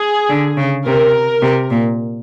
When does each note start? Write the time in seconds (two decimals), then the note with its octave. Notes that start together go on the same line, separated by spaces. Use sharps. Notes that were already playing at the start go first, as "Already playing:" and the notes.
Already playing: G#4
0.29 D3
0.58 C#3
0.86 C3 A#4
1.42 C3
1.70 A#2